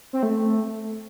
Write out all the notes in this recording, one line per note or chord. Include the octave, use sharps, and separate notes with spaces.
C4
A3